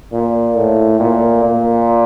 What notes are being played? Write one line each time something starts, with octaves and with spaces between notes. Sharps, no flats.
A#2
A2
A#2
A#2